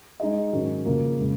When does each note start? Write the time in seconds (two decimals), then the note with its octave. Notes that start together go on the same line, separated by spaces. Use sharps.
0.20 G#3 D#4 G#4 D#5
0.53 G#2 D#3 F#3 C#4
0.85 C#3 F3 A#3
1.19 C#3 G#3 C#4